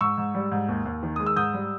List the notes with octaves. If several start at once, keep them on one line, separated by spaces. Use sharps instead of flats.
G#2 C#6 E6
G#2
G3
G#2
D#2
D#2
D#3
G#3 D#6
E6
G#2 D#6 G6
G3